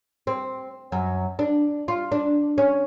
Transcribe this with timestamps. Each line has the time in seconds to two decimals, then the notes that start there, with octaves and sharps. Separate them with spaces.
0.27 C4
0.92 F#2
1.39 D4
1.88 F4
2.12 D4
2.58 C#4